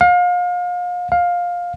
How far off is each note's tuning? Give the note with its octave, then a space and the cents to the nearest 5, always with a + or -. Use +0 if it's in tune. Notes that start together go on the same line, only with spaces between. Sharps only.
F5 +35
F5 +15